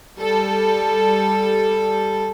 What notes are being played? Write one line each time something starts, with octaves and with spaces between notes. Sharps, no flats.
G3 A4